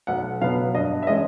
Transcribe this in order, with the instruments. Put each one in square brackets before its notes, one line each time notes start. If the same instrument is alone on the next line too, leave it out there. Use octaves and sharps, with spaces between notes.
[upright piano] B1 F#5
B2 F#3 B3 F5
G2 D#5
E5
E3 G#3 C#4 D#5